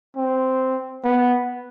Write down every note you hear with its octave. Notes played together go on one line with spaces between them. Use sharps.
C4
B3